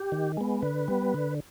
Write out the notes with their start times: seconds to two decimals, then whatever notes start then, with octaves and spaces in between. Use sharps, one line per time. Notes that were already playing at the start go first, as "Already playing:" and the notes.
Already playing: G4
0.12 D#3
0.37 G#3 B3
0.62 D3 B4
0.88 G3 B3
1.14 D3